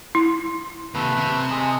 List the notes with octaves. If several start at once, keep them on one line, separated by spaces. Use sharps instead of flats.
E4
D#2 C3 A3 B4
C3
G#3 G#4 D#6